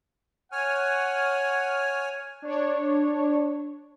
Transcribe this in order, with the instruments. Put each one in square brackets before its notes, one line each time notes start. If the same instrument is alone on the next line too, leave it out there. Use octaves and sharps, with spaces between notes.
[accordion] C#5 G#5 F6 [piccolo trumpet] F#5
[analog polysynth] D4 C#5